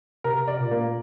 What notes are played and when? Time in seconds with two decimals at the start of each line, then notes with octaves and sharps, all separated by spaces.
0.24 C3 A#4
0.48 D5
0.60 A#2
0.71 A#3